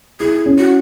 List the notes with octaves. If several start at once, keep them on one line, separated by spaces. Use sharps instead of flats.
E4 G#4
C#4
F#4